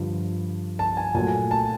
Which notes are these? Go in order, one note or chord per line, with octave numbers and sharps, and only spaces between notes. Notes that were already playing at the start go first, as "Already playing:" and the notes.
Already playing: G2 D3 F3
A5
G#5
A#2 F#3 A3 G#5
A5